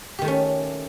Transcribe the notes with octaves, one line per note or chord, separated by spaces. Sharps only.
D#3 A3 C#4 G4